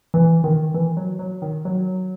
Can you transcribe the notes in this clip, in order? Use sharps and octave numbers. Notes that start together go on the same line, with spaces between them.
E3
D#3
E3
F#3
F#3
D#3
F#3